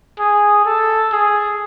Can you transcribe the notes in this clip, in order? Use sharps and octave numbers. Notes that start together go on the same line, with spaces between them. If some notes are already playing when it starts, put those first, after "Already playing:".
G#4
A4
G#4